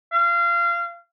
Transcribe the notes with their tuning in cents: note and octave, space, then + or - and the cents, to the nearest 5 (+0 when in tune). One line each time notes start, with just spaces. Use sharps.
F5 -25